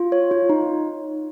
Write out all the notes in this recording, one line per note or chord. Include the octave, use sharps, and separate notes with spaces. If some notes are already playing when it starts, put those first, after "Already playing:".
Already playing: F4
C#5
F4
D#4